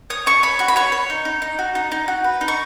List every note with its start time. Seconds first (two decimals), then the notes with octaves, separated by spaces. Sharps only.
0.10 C#5 D#6
0.26 C#5 C#6
0.43 C#5 B5
0.59 F#4 C#6
0.68 B5
0.76 C#5 C#6
0.92 C#5
1.10 D#4
1.25 D#4
1.42 D#4
1.59 F#4
1.75 D#4
1.92 D#4
2.08 F#4
2.24 B4
2.41 D#4
2.48 C#6